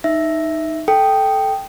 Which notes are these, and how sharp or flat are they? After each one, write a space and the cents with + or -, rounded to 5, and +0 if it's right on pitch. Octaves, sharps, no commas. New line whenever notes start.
D#4 +0 E5 +0
A4 -10 G5 +0